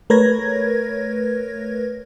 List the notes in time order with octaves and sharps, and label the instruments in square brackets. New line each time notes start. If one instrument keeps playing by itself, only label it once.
[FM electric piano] A3 A#4 B4 C#5 G#6 A#6